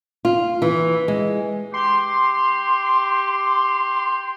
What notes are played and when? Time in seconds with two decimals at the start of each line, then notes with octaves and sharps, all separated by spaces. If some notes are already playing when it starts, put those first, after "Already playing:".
0.25 F4
0.62 E3
1.08 G#3
1.74 G4 C6